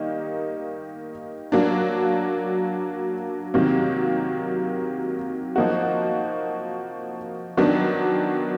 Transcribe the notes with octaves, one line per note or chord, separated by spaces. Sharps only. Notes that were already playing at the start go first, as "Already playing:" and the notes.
Already playing: D#3 G3 A#3 D#4
F#3 A#3 D4
C3 D#3 F#3 A#3
F3 A#3 D#4 F#4
D#3 F#3 B3 D4